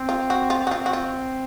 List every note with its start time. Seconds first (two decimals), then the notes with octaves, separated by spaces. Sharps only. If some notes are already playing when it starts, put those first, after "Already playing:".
Already playing: C4
0.09 F4
0.30 F#4
0.50 F4
0.67 F#4
0.71 C4 F4
0.86 F#4
0.93 F4